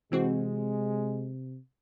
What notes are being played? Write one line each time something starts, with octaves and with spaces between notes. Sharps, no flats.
C3 E3 G#3 C4 F#4